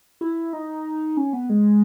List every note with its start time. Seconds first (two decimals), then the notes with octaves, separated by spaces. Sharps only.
0.21 E4
0.53 D#4
1.17 C#4
1.33 B3
1.49 G#3